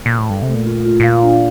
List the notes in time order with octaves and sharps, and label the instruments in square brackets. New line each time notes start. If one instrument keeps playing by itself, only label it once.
[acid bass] A#2
A2
[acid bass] G2 [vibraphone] A4
[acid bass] C3
[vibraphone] A3
[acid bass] A#2
[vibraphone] F4
F4
[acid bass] A2
[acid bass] A#2 [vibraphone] F5
[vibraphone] D4